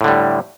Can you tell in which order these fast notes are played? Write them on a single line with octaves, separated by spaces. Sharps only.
A2 D3 G3